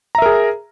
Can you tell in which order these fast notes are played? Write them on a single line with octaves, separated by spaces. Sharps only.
A#5 E5 A#4 G#4